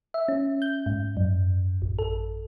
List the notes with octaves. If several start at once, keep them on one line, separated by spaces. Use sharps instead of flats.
E5
C#4
G6
G#2
F#2
A1
A4